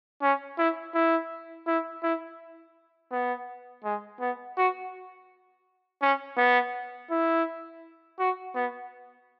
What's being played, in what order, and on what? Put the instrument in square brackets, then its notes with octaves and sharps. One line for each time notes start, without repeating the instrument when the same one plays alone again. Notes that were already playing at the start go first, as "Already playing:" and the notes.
[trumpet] C#4
E4
E4
E4
E4
B3
G#3
B3
F#4
C#4
B3
E4
F#4
B3